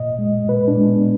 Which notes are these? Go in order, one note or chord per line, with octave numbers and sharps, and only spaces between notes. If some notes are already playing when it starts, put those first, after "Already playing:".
Already playing: A#2 D#5
G#3
A#2 B4
D4
G#3
B3